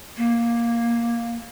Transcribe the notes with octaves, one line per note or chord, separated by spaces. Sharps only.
A#3